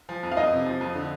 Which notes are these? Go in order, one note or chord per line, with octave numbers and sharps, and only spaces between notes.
F3
F2
F5
F2 D#5
C3
F3
F2
D3